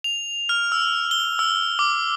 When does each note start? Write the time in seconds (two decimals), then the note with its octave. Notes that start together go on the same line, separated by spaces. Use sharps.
0.04 F7
0.49 F6
0.72 E6
1.11 G7
1.39 E6
1.79 D6